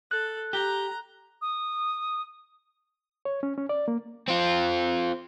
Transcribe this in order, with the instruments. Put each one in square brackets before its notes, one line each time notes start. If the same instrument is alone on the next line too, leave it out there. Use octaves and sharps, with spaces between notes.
[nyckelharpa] A4 [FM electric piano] F#6
[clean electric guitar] G4 [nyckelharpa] A#5
[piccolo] D#6
[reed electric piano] C#5
C#4
C#4
D5
A#3
[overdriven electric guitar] C4 F4